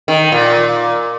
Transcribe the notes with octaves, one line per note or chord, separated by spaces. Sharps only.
D#3
A#2